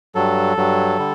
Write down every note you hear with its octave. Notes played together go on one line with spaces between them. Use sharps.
G2 F#3 A4
G2 F#3
D3 G3